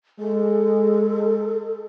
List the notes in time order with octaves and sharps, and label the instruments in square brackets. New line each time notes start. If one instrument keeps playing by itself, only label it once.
[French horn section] G#3 [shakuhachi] A4